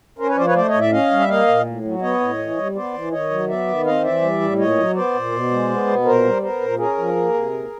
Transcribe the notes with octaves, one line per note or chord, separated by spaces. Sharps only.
C#4 A#4 C5
B4 C#5
F3 C5 D5
B4 C#5
A3 C5 D5
C#5 D#5
A2
D5 E5
C#4 D#5 F5
G3
E5
A#3 D#5 F5
A#2
A2
F#3
B3 C#5 D#5
A2
E3
G3
B3 C5 D5
E3
D#3 C#5 D#5
F#3
B3 D5 E5
D#3
C4 D#5 F5
E3 D5 E5
G3
A2
A#2 C#5 D#5
F#3
B3 C5 D5
A#2
B2
G#3
B3
B2
A#2 A#4 C5
G3
B3 A#4 C5
A#2
C#4 G#4 A#4
F3
A#3
C3
A#2